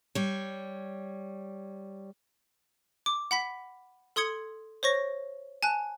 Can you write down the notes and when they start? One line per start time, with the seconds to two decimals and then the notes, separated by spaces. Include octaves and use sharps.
0.15 G3 C#5
3.06 D6
3.31 F#5 B5 B6
4.16 A4 C6 D#6 G#6 C#7
4.83 C5 C#5 C#6 A#6
5.63 G#5 A5 F#6